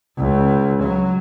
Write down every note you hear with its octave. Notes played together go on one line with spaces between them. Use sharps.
C#2
F#3